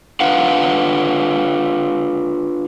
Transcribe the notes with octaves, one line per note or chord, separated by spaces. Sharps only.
D4 F4 B4 F5 F#5